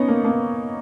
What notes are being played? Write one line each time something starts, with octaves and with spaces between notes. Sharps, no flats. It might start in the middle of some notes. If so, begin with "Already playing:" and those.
Already playing: B3 C#4 D#4
A#3
A#3
B3